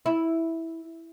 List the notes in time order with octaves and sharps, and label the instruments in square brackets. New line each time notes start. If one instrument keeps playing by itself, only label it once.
[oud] E4